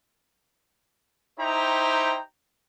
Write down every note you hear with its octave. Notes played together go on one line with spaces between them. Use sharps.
D#4 E4 G4 C5 G5 A#5